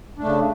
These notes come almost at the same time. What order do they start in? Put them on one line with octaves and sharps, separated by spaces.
D4 A3 C#3